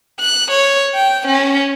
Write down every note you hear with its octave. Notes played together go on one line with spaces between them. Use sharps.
F#6
C#5
G5
C#4